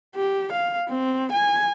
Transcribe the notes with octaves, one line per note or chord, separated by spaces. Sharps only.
G4
F5
C4
G#5